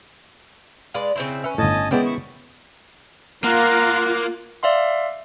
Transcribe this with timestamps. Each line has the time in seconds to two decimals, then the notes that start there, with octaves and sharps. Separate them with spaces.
0.94 G#3 B4 D5 F5
1.16 C#3 C4 E4
1.44 C#4 B4 E5
1.58 G1 A2 D#5 G#5 A5
1.91 D#3 G#3 B3 C#4 E4 D5 G5
2.06 C#6
3.44 A#3 F4 A#4 F#5
4.63 D5 E5 F5 C6